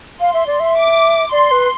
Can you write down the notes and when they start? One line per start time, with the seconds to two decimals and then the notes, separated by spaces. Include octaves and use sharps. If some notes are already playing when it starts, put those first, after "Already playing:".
0.20 F5 C6
0.34 E5
0.47 D5
0.60 E5
0.77 D6
1.32 D5 C6
1.51 B4